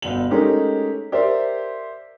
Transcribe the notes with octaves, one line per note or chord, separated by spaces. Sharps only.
G1 B2 F#7
G#3 A3 C#4 D#4 G4 A#4
G4 A#4 C5 D5 E5